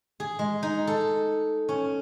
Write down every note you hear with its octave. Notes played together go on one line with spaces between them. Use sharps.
G#4
G#3
D#4
A4
C#4